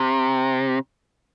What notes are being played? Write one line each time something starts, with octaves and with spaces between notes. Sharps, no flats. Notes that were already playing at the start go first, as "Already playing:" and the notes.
Already playing: C3